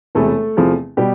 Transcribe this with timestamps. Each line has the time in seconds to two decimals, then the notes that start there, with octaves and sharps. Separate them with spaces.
0.15 E1 E2 C3 A3 A4
0.57 E2 C3 F3
0.97 B2 G3 G4